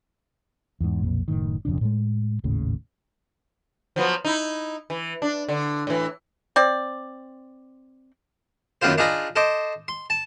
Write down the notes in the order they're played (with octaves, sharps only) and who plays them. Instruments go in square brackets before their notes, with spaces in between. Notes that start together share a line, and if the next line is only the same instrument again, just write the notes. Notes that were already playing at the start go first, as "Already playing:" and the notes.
[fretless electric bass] E2 G#2
B1 F2 A#2 A#3
F#1 A2 D#3
E1 F2 C#3 D4
A2 G#3
G#1 D#2 A2 C#3
[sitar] F3 F#3 B3
D#4 E4
E3
D4
D3
A2 E3
[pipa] C4 D5
[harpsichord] F#2 D#3 A#3 B3 F4 C5
D4 D#4 F4 G#4 A#5 B5
A4 C5 D#5 D6
C6
A5